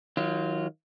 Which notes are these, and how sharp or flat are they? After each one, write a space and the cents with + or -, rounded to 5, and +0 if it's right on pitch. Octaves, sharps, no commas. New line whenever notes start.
D#3 +35 F#3 +0 F4 -15